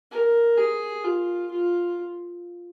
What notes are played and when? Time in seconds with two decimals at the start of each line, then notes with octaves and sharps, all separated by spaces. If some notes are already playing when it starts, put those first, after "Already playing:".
0.11 A#4
0.57 G#4
1.04 F4
1.51 F4